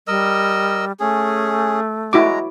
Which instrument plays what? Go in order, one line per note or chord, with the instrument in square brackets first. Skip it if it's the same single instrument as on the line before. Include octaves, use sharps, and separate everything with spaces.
[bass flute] G3 [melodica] A#4 D#5 E6
[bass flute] A3 [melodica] C#4 G#4
[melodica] G#3 A#5 [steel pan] E4 F#4 D6